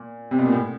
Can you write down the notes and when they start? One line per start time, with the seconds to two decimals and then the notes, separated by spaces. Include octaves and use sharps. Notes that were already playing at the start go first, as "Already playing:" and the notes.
Already playing: A#2
0.31 C3
0.39 B2
0.45 A#2
0.52 A2